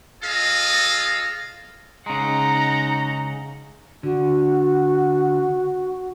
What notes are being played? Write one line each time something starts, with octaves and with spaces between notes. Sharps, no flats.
F4 G#4 A4 D#5 F5
C#3 G#3 D#4 F#5 A#5
D3 F#4